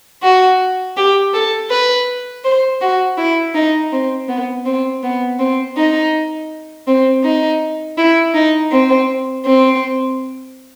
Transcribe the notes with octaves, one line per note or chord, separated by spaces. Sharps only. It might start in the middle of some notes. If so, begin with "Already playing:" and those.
F#4
G4
A4
B4
C5
F#4
E4
D#4
C4
B3
C4
B3
C4
D#4
C4
D#4
E4
D#4
C4
C4